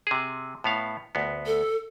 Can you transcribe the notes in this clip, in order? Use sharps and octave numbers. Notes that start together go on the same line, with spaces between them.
C3 G#4
A2 B3 F5
D2 B3
A4